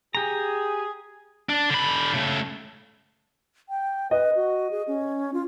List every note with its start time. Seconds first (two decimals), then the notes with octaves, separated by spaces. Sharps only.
0.15 G4 G#4 A#5
1.49 D4
1.70 D3 B5
2.14 C#3 A3
3.69 G5
4.11 B4 D#5
4.36 F#4
4.71 G#4
4.88 C#4
5.33 F4